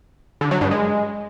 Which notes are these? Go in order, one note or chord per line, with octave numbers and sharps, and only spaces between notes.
D3
F#3
G2
G#3